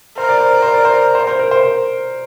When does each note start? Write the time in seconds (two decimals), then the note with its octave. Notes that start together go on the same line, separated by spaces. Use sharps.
0.17 A#4 C5
0.29 D5
0.40 C5
0.51 D5
0.62 C5
0.74 D5
0.85 C5
1.15 C5
1.27 C5
1.39 A#4
1.51 C5
1.63 C5